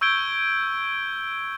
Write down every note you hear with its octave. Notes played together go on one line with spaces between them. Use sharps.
C#6 E6 G6 G#6 D7 G7